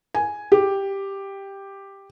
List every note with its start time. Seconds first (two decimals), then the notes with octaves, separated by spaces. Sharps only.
0.15 G#5
0.52 G4